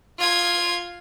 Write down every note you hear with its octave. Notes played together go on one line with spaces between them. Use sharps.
F4 G#6